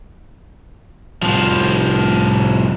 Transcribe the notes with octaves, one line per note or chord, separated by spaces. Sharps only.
C2 F3